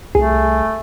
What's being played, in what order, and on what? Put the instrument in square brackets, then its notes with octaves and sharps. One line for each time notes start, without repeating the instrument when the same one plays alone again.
[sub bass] C2 [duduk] A3 [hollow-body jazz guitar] G#4